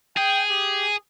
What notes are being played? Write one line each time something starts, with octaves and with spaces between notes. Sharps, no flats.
G#4 G5
G4